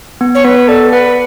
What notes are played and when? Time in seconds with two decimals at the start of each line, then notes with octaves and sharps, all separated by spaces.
0.21 B3
0.35 C#5
0.44 B3 B4
0.68 A4 D5
0.92 B4 F#5